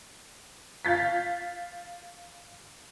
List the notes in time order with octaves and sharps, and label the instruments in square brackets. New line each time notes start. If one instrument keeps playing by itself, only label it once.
[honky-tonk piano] F5 G6 A6 B6